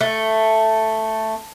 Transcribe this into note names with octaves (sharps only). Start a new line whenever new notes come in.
A3